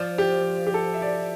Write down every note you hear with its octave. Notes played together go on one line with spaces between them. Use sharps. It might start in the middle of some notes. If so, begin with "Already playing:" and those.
Already playing: F3 D5
G4
G4
A4
E5
D5